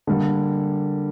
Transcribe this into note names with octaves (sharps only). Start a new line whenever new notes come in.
D3 G3 A#3